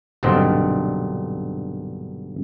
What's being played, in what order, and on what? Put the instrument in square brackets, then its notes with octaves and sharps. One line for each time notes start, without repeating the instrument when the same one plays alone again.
[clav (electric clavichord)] B1 G2 A#2 D3 C4 D#5